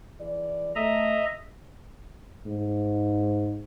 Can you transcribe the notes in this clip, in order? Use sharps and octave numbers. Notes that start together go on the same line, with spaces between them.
E3 G#4 D5
A3 D#5 E5 A#5
G#2